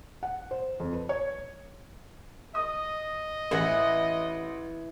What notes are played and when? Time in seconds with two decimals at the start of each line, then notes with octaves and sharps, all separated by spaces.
0.23 F#5
0.51 C5
0.80 F2
0.93 B4
1.09 C#5
2.55 D#5 D#6
3.51 A1 E3 F#5 A#6